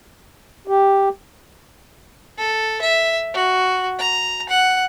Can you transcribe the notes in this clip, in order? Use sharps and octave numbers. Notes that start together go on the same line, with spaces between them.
G4
A4
E5
F#4
A#5
F#5